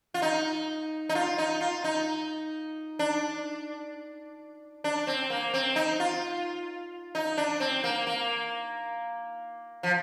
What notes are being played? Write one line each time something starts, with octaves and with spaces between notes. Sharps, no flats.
F4
D#4
D#4
F4
D#4
F4
D#4
D4
D4
C4
A#3
C4
D#4
F4
D#4
D4
C4
A#3
A#3
F3